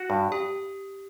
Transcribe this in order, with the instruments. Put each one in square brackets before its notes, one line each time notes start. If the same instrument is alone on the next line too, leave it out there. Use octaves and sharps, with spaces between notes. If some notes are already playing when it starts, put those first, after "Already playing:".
Already playing: [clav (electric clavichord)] F#4
G2
[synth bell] G4